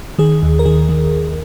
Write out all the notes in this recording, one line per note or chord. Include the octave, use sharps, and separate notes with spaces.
D#3 G#4
D#2
A#4
D#3 G#4
D#3